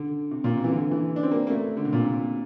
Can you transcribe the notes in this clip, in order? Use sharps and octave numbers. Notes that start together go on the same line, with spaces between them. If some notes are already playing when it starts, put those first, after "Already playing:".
Already playing: D3
C3
A#2
C3
E3
D3
E3
D4
C4
A#3
A#3
A3
D3
C3
A#2
C3